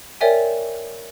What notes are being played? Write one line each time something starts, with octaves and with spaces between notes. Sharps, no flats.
A#4 C#5 D5 E5 G5 G#5